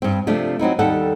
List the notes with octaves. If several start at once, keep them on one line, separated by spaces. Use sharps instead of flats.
G2 C4
C3 F3 A3 D4
F#3 C4 D#4 E4
D#2 G3 A4 F#5